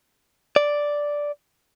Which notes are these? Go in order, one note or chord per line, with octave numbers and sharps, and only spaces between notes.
D5